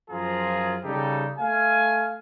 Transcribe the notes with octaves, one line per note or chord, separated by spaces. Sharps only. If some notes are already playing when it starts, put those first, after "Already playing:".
F#2 F3 F4 G#4 A#5
C#3 G3 D#4 G4 A4
A3 F5 G#5